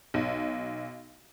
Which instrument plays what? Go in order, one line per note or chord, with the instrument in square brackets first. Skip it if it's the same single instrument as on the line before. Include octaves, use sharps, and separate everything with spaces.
[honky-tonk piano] B1